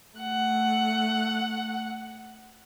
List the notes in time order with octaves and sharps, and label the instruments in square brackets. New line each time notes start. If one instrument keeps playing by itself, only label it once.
[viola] A3 F#5